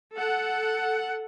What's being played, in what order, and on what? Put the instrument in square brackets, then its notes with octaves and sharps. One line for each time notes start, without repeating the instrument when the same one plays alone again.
[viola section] A4 F#5